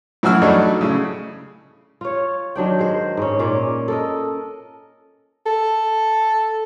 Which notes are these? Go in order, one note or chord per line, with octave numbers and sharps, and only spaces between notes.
A2 E3 F#3 F#4 E6 F6
F#3 G3 A3 D4 D#4
A2 C#3
F4 C#5
D#3 F#3 D4 G5
G#3 C5
G#2 C#4
A#2 A#3 C#4 D5
A4 A#4 D#5
A4